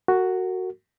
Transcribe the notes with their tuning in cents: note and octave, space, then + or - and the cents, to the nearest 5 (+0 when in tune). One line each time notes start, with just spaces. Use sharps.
F#4 +5 A#4 -40